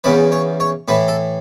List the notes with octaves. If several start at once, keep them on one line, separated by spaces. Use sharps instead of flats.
E2 C#3 E3 B4
C#5
C#5
A2 E3 B4
A4